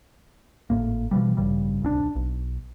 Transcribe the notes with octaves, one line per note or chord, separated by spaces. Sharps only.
G#1 F#2 A2 A#3
B2 E3 F3 G3
A1 G2 C#3 G3
D1 C2 C4 D4
B1